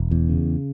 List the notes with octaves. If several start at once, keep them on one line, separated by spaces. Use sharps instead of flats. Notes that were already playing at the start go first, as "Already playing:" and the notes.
Already playing: E1
E2
C#3